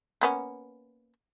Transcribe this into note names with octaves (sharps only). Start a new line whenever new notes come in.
A#3 B3 C#4